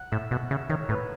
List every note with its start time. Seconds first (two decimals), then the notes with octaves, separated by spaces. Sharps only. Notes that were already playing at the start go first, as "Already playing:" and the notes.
Already playing: F#5
0.12 A2 E5
0.31 B2 F#5
0.51 C#3 E5
0.69 D#3 C#5
0.89 A2 B4